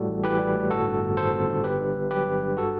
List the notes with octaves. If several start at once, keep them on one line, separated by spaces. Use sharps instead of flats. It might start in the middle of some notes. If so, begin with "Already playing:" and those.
Already playing: A2 G3 F#4 A4
A1
E3 G4 B4
G3
A2
G1 F#4 A4
G2
G1
D#3 A4 C5
G1
G2
G1 G4 B4
G2
G1
F#3 G4 B4
G1
G2
F#4 A4